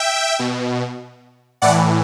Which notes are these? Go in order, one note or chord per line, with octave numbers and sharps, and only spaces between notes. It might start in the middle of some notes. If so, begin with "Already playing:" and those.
Already playing: E5 G5
B2
A2 E3 D5 F#5